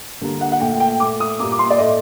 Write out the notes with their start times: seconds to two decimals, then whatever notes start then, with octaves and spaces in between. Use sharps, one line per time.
0.21 D3 G3 A#3
0.41 F#5
0.52 F#5
0.60 A#2 A3 G5
0.80 G5
1.00 A#2 A3 D6
1.20 D#6
1.39 A#2 G3 A#3 D6
1.52 D6
1.59 C6
1.70 D5
1.78 A2 A3 D#5